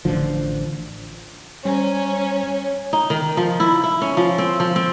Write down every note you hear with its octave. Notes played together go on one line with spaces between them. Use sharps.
A1 D3 F3
G3 C#4 C5 A#5
D#4
D#3
F3
E4
E4
C#4
F3
C4
F3
C4